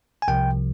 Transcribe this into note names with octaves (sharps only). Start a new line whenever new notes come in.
G#5
C2 C3 F3 G5